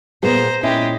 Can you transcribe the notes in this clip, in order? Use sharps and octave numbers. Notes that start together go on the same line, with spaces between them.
A#2 B3 G#4 C5 A#5
A#2 G#3 C#4 E4 G4